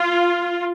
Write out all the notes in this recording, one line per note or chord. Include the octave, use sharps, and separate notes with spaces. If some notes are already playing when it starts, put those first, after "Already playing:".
Already playing: F4